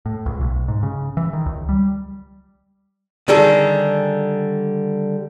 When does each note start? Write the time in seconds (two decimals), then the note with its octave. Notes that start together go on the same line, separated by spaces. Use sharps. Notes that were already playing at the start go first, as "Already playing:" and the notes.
0.06 A2
0.26 C#2
0.40 B1
0.68 G#2
0.83 C#3
1.17 E3
1.33 D#3
1.46 C#2
1.69 G3
3.28 D3 D#3 G3 G#4 A4